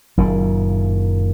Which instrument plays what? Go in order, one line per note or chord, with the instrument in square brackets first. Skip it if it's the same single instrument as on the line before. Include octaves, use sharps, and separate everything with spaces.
[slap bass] F#1 A#2 D#3